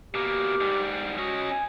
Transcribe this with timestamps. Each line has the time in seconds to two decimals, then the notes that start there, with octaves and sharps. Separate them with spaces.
0.14 B2 A#3 G4
0.61 G#2 G3
1.18 C#4 F#4 D#5
1.51 G#5